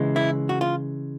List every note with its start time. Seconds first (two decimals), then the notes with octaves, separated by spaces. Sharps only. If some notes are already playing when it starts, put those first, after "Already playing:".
Already playing: C#3 E3 G#3
0.16 E4
0.49 F#4
0.61 F4